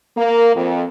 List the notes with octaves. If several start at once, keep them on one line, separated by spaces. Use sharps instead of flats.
A#3
F2